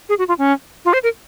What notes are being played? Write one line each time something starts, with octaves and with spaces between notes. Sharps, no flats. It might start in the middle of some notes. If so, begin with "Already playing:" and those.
G#4
F#4
F4
C#4
F4
C5
A#4